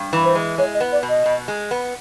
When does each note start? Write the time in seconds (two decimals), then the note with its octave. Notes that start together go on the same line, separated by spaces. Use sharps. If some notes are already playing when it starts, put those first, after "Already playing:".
Already playing: G2
0.13 E3
0.24 C5
0.35 G#3
0.58 G#3 C#5
0.74 D#5
0.81 B3
0.92 D5
1.03 B2
1.09 D#5
1.26 B2
1.48 G#3
1.71 B3